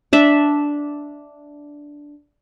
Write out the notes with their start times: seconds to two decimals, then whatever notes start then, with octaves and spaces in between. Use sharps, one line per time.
0.13 D4 E5